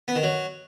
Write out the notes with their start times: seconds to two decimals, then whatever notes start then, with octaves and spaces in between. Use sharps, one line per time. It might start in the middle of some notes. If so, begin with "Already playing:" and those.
0.08 B3
0.16 D#3
0.23 F#3